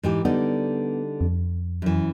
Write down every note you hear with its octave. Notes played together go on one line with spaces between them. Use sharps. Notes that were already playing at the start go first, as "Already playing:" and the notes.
G#2 E3 G4
D3 G3 B3 D#4
F2
F#2 E3